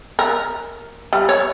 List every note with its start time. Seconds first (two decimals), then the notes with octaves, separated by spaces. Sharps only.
0.19 A#4
1.13 G3
1.29 C#5